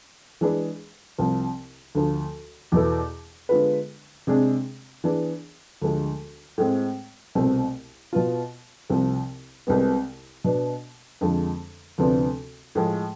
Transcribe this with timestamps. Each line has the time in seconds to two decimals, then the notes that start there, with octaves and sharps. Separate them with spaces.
0.41 E3 G#3 D4 G#4 B4
1.18 C2 C3 F3
1.95 D2 D3 F3
2.72 E2 B2 B3 E4 A4
3.49 D3 G#3 B3 F4 B4
4.27 C3 G#3 D4 G#4
5.04 E3 B3 D4 G#4
5.82 D2 D3 F3 G#3
6.58 A2 G#3 C4
7.35 C2 B2 A3 C4
8.13 B2 B3 F4
8.90 C2 C3 F3
9.67 C2 C3 G#3 B3
10.44 B2 B3 D4
11.21 F2 D3 F3 G#3
11.98 D2 C3 F3 B3 D4
12.75 A2 F3 G#3